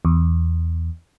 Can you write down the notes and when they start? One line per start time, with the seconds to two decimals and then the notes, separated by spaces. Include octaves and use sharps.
0.05 E2